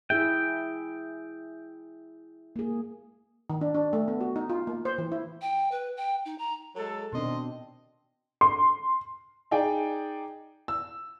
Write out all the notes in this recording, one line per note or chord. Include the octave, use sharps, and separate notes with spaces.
E4 G#4 E5 G5
A#3 G#4
D#3
D4
D4
A3
B3
F#4
D#4
F4
A#3
C5
E3
E4
G5
B4
G5
D#4
A#5
F#3 G#3 A4
B2 D#3 C4 D4 D#5 C6
C6
D#4 G#4 D5 G5
E6